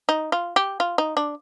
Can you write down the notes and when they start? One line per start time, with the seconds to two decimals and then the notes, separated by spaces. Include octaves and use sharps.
0.09 D#4
0.32 F4
0.56 G4
0.80 F4
0.98 D#4
1.17 D4